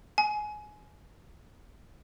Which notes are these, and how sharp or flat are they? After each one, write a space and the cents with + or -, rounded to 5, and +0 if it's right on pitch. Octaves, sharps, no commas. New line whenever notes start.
G#5 +20